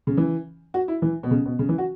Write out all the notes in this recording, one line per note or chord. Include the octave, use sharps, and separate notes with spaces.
C#3
E3
F#4
E4
E3
B2
C#3
B2
C#3
E3
F#4